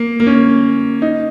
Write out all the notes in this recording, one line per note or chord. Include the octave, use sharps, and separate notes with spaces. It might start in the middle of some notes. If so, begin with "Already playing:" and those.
Already playing: A#3
A#3
C#4
D#4